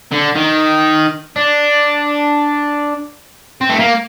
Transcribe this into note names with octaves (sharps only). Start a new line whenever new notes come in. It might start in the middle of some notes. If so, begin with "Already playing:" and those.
D3
D#3
D4
C4
A3
A#3